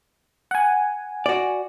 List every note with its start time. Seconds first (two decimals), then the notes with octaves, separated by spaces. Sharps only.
0.51 F#5 G#5
1.26 F#4 D5